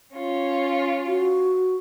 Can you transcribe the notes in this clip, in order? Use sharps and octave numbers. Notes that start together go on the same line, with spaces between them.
C#4 F4
F#4